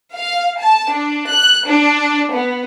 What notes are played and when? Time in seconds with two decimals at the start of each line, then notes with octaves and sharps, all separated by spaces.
0.14 F5
0.59 A5
0.91 D4
1.29 F#6
1.67 D4
2.33 B3